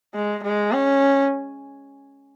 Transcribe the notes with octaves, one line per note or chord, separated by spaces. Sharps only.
G#3
G#3
C#4